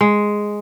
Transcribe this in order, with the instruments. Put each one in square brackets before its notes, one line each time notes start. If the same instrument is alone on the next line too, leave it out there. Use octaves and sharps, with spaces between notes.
[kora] G#3